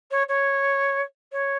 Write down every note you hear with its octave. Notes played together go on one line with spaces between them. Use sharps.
C#5
C#5
C#5